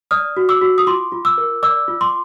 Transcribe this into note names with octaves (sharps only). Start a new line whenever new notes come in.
D5 D#6 F6
F#4
D6 E6
F#4
D#6
F4 C6 D6
F4
D6 E6
A#4
D5 D6 E6
F4
C6 D6